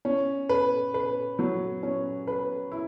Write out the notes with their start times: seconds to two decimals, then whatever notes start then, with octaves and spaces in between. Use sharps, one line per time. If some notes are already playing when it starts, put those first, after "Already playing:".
0.05 C#4
0.49 B4
0.94 B4
1.39 F#3
1.83 C#4
2.27 B4
2.72 E4